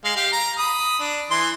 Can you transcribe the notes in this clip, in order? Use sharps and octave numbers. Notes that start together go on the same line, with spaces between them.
G#3 F5
G4 F5
A#5
B5 D#6
D4
E3 C6